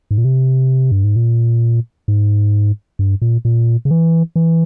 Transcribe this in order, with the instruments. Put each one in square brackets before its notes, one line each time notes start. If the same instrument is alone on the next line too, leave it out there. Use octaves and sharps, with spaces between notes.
[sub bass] G#2
A#2
C3
G2
G#2
A#2
G#2
G2
A#2
A#2
C#3
E3
E3